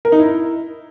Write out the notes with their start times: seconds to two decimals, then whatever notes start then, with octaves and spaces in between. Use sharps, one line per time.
0.05 A#4
0.12 D#4
0.20 E4